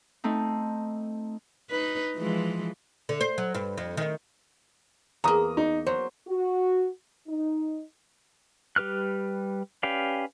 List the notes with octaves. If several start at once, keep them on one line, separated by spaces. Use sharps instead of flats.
A3 C4 D#4
D#4 B4
E3 F3 G#3
D3
C5
F#3
G2
F2
D#3
E2 A#3 A#5 D#6
D#4
F#3 C5
F#4
D#4
G3 G4 B4 F6 F#6
C#4 G4 B4 D5 F5